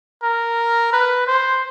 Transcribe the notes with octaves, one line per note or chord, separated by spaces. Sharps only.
A#4
B4
C5